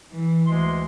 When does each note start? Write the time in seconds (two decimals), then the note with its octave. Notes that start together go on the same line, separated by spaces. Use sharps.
0.12 E3
0.47 D2 G#3 C6